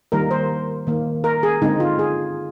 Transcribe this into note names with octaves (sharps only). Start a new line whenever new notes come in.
D#3 G3 A#3 A#4
C5
D#3 A#3
A#4
G#4
D3 G#3 C4 D#4
F4
G#4